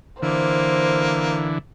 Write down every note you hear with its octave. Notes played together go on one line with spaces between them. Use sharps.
D3 E3 A#3 C5